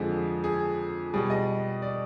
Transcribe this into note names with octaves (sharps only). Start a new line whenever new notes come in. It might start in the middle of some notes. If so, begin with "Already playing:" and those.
Already playing: F2 D3 F3 G#3 G#4
G#4
B2 G3 G#4
D#5
D5